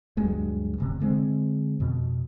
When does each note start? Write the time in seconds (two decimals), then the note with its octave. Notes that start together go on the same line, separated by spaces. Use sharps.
0.17 D2 G2 F#3 G#3
0.78 D1 G1 C3
1.00 D3 G#3 A#3 C4
1.80 F2 B2